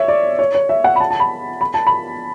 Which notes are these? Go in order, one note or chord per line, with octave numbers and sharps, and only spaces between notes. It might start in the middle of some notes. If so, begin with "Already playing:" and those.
Already playing: C#5 E5
D5
C#5
C#5
E5
F#5
B5
A5
A5
B5
B5
A5
B5